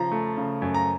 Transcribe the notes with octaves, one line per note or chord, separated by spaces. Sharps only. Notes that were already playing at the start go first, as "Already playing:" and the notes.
Already playing: C#3 F3 A#5
A3
C#3
F#2
A#5